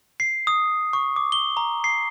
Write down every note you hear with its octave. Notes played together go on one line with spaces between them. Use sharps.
C7
D#6
C#6
D6
G7
A#5
C7